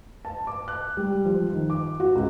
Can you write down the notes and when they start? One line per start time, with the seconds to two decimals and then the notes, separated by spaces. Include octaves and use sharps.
0.25 A5
0.47 D6
0.68 F#6
0.97 G3
1.25 F3
1.52 D#3
1.70 D6
2.00 F#4
2.15 C#2